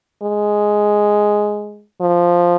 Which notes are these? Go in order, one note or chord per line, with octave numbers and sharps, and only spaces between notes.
G#3
F3